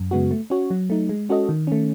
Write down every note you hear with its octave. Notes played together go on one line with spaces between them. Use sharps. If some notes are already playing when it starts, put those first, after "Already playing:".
Already playing: F#2
C#3 G#3 B3 F#4
A3
C#4 F#4 C#5
F#3
A3 D#4
G#3
C#4 F#4 A4 D#5
D#3
A3 C#4